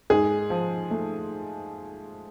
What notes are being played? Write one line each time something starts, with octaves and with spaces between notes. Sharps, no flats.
G#2 G#4
F3
A3